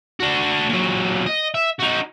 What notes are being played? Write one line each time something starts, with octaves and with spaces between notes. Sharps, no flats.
D4 F#4
A#2 F#3
D#5
E5
D#4 F#4